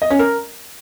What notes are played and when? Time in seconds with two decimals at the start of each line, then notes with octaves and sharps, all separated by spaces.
0.02 D#5
0.10 C#4
0.19 A#4